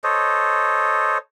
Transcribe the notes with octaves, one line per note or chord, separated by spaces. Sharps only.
A4 C5 C#5 D#5